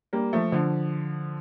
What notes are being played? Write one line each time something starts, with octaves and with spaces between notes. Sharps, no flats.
G3 A#3
F3 A3
D3 F3